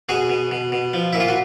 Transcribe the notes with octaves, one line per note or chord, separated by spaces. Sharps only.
B2 F#4 G#4
B2
B2
B2
F3
A#2 E4
F4
F#4